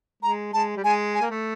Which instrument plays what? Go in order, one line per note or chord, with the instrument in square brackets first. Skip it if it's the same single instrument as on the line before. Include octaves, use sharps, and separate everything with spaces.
[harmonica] G#3 [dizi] A#5
[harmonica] G#3 [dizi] A5
[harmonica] G3
[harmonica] G#3 [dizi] G#5
[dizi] G#5
[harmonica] A#3
A3